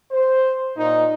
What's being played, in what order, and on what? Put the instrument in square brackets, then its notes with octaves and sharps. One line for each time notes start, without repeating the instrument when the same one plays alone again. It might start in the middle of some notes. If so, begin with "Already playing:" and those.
[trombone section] C5
A#2 D#4